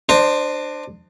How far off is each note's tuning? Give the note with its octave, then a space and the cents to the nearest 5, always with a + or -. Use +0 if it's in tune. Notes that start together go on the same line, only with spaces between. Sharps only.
D4 +20 C5 +0 D#5 -15